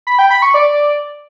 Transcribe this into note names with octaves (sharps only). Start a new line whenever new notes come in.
B5
G5
B5
C#6
D5